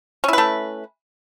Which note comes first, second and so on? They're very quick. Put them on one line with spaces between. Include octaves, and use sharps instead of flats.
C#4 E4 B4 A3